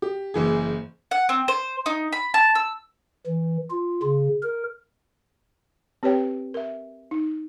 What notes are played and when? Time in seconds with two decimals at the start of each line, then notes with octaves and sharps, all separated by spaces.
0.02 G4
0.34 F#1 E3 G#4
1.11 F#5
1.29 C4
1.48 C5
1.86 D#4
2.12 B5
2.34 A5
2.55 E6
3.27 E3
3.71 F4
4.03 C#3
4.43 A#4
6.03 C4 G4 B4 C#5 G5
6.54 A#4 E5
7.11 D#4